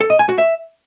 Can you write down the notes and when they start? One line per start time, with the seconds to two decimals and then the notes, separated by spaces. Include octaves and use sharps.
0.01 A4
0.10 D#5
0.19 G#5
0.29 F#4
0.38 E5